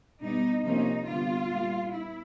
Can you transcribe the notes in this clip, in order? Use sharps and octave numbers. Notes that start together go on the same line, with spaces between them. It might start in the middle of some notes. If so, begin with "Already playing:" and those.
B2 G3 B3 D#4
C3 F3 A#3 C#4 D#4
D3 G3 B3 F4
A#2 G3 A#3
B3 E4